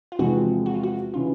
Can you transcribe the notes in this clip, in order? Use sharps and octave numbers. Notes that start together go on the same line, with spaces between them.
F4
E2 C3 F3 G#3 C4 F#4
F#4
F4
F#4
C#3 E3 F4